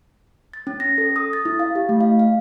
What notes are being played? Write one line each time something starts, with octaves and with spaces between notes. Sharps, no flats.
A6
C#4
A#6
A4
D#6
A6
E4
F5
G4
A3
F5
F5